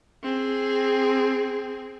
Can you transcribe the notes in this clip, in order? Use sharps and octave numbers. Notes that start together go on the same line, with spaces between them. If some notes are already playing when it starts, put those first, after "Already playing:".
C4 G#4